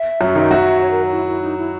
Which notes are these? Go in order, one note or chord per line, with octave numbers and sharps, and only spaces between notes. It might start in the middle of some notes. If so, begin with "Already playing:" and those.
Already playing: E5
F#2 F#3
D#3 D#4
F#3 F#4
C#5
A#4
E4
E4
D#4
E4